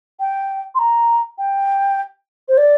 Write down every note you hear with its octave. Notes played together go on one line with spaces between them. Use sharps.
G5
C6
A#5
G5
C5
D5